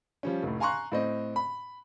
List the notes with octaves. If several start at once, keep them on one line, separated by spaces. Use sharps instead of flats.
F3 G3 C#4
F1 A2
F5 G#5 A#5 C6 C#6 F#6
A2 C4 D#5
B5